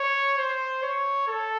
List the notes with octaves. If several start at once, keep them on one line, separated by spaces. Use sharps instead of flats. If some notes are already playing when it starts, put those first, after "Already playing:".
Already playing: C#5
C5
C#5
A4